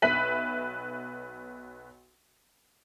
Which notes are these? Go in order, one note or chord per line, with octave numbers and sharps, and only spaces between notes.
B1 B4 E5 B6 F#7